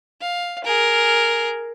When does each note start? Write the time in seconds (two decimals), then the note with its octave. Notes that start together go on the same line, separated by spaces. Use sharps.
0.21 F5
0.64 G#4 A#4